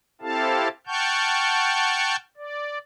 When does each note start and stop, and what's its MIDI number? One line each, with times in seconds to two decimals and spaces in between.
0.22 0.68 60
0.22 0.68 64
0.22 0.68 67
0.22 0.68 69
0.22 0.68 77
0.22 0.68 81
0.87 2.16 78
0.87 2.16 79
0.87 2.16 81
0.87 2.16 85
0.87 2.16 89
0.87 2.16 91
2.37 2.78 74